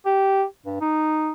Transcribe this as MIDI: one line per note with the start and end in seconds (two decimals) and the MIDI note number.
0.05 0.44 67
0.66 0.76 43
0.81 1.32 63